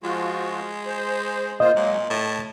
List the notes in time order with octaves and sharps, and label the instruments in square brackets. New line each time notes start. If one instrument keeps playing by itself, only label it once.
[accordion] F3 F4 F#4 [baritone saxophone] G#3
[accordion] C5
[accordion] A#3 F4 C5 [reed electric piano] D#5
[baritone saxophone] A#2 [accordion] F#3 G#3 A#3
[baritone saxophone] A2 [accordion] A5